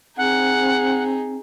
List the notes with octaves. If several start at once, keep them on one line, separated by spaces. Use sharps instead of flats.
C4 D#4 G#4 F#5